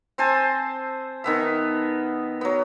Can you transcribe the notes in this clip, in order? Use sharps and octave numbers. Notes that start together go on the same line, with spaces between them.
C4 C5 G#5 A5
D#3 B3 E5
F#3 B3